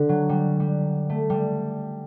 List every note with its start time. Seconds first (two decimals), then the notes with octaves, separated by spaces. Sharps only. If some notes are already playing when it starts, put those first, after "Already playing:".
Already playing: D3
0.09 F#3
0.29 G3
0.60 G3
1.10 A3
1.30 G3